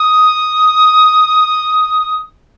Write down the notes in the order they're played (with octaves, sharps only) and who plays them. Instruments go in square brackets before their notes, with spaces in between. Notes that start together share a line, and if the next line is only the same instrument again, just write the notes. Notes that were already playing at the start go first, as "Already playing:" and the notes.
Already playing: [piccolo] D#6